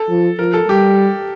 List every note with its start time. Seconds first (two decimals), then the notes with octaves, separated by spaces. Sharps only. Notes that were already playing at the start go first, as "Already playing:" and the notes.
Already playing: A4
0.09 F3
0.39 F3 A#4
0.54 A4
0.68 G3 G4